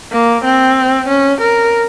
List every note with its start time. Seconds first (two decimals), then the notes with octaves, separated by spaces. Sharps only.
0.12 A#3
0.45 C4
1.08 C#4
1.41 A#4